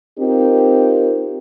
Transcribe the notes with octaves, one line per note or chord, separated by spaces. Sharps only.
C4 D#4 F4 G4 A#4